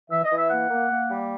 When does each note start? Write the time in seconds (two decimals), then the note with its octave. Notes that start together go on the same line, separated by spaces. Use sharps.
0.10 E3 E5
0.24 D#5
0.31 E3
0.37 E5
0.50 A#3 F#5
0.70 A#3
0.90 A#3
1.10 G3